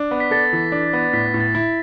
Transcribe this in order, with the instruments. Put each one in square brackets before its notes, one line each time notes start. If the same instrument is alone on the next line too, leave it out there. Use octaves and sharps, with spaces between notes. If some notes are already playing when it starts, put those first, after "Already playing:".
Already playing: [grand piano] D4
B3
[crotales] B6
[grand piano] A4 [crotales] A6
[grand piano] E3
D4
B3
[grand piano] A2 [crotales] B6
[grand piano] A2
[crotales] A6
[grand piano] E4